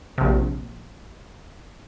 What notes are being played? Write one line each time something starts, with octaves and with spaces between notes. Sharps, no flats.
A#1 C3